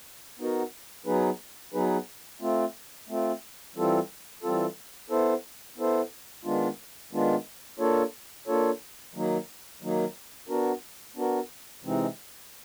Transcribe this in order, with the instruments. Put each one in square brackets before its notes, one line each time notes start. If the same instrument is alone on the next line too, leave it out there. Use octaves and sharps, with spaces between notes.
[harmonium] B3 D#4 F#4 A#4
F#3 B3 D#4 G#4 B4
F#3 B3 D#4 G#4 B4
A3 C4 F4
A3 C4 F4
E3 G3 C4 F4 A4
E3 G3 C4 F4 A4
B3 E4 A4 C5
B3 E4 A4 C5
D#3 G#3 B3 D4 F4
D#3 G#3 B3 D4 F4
A#3 D4 F4 A4 C#5
A#3 D4 F4 A4 C#5
D#3 F#3 A#3 D#4
D#3 F#3 A#3 D#4
B3 D4 F#4 A#4
B3 D4 F#4 A#4
C3 E3 G#3 C4 D#4